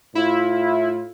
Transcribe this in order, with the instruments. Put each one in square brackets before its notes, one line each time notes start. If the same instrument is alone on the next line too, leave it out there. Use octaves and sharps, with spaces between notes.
[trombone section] A2 F4 [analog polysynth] E4